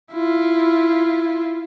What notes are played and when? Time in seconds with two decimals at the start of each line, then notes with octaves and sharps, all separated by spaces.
0.12 E4 F4